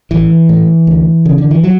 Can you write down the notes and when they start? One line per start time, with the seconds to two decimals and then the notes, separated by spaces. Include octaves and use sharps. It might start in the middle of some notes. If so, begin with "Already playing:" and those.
0.11 A1 E3
0.49 A2
0.87 D2
1.26 C#3
1.38 D3
1.51 E3
1.63 F#3